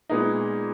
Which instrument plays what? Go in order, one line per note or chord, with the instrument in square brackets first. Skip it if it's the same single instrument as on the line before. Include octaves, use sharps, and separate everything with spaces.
[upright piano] A#2 G#3 B3 D#4